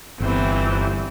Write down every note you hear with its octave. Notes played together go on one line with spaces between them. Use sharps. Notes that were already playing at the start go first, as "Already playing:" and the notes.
G1 E3 C4